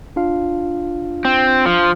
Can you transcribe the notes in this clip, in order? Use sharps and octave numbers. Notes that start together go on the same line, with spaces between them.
D4 F4 F5
C4
F3